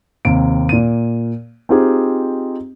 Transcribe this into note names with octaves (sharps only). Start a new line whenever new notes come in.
D#2 C3 D7
A#2 D#7
C4 D#4 F4 G4 G#4